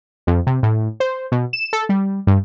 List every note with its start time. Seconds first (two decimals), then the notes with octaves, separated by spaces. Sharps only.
0.27 F2
0.47 C3
0.63 A2
1.00 C5
1.32 B2
1.53 E7
1.73 A4
1.89 G3
2.27 G2